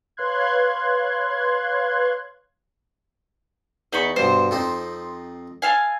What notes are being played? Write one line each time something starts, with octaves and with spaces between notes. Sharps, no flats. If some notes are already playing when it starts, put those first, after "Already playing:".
B4 C#5 F5 C6 F#6 G#6
E2 D#4 B5 C#6
G2 B2 C5
F2 C4 D#4
A4 F5 G#5